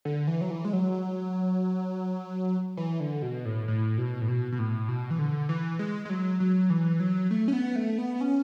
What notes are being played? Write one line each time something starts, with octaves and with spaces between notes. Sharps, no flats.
D3
E3
F#3
E3
G#3
F#3
E3
D3
B2
A2
A2
B2
A2
B2
B2
A2
B2
E3
D3
E3
G#3
G#3
F#3
F#3
E3
F#3
A3
C#4
B3
A3
B3
C#4